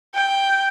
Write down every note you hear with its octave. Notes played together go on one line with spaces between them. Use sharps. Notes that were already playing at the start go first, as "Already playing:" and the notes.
G5